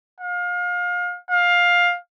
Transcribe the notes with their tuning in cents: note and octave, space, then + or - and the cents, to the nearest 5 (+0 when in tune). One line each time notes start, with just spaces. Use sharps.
F5 +30
F5 +15